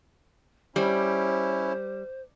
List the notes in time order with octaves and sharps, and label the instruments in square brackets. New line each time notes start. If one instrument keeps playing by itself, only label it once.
[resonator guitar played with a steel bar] G3 [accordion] C#4 E4 [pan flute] C5